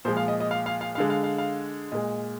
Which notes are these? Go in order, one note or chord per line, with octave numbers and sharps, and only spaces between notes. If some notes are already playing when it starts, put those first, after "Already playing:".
A#2 F3 G#3 C5
F5
D#5
D#5
F5
F5
F5
F5
D3 G#3
F5
F5
F5
A#2 G#3 D#5